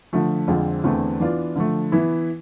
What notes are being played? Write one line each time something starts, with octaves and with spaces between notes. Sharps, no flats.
D3 F3 A3
F2 D3 G#3 C4 F4
E2 D3 A3 C4
E3 B3 D4 F4
D3 F3 A3
E3 B3 E4